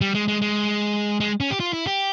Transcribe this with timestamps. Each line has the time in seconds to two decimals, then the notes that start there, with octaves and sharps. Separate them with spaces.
0.01 G3
0.14 G#3
0.28 G#3
0.41 G#3
1.20 G#3
1.40 C#4
1.50 G4
1.60 F4
1.73 E4
1.87 G4